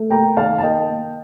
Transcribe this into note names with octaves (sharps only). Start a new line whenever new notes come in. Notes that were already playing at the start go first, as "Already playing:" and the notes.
Already playing: A3
A#3 G5 A#5
D#3 F5 A5
A5
A#3 D#5 G5
A#3